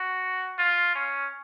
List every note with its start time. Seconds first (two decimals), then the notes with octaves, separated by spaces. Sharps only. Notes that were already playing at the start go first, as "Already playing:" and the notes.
Already playing: F#4
0.59 F4
0.95 C#4